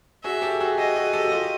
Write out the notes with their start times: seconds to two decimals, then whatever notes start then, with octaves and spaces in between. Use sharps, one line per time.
0.24 F#4 G#4 E5
0.42 G4 A4
0.61 F#4 G#4
0.78 F#4 G#4 D#5
0.96 F#4 G#4
1.13 G4 A4
1.24 F#4
1.32 F4 G4